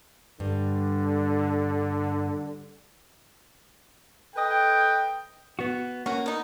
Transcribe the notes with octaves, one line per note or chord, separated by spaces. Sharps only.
G2 D3
A4 B4 D#5 G5
B3 F#4
A#3 C#4 F#4
B3 D#4